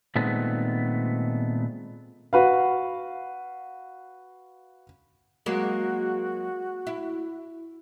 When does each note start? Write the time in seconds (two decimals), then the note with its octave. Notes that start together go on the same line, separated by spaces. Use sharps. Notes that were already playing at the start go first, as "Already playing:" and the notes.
0.16 A#2 D#3 G#3 A3 B3 C4
2.33 F#4 B4 F5
5.46 F#3 G#3 A#3 F#4
6.87 E4